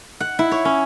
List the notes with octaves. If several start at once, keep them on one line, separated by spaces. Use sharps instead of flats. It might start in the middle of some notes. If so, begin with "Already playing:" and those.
F#5
E4
C#5
C#4